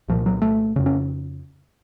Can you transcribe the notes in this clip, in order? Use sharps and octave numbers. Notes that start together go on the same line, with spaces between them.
C2 A#2 F3
F#3
A3
F2 C#3
C#4